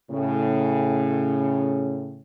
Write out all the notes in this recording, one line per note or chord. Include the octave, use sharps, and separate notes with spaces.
A2 C#3